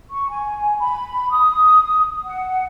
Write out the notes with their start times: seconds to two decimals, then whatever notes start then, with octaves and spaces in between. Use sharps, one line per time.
0.09 C#6
0.29 G#5
0.78 B5
1.30 D#6
2.23 F#5